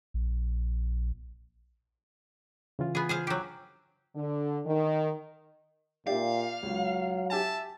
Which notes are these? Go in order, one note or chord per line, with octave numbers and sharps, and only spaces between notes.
A#1
C#3 E3 F4
B3 G#4
G#4 C5 F5
F#3 G4
D3
D#3
A#2 G4 D5 E5 F5
C#2 F#3
G4 E5 G#5 A5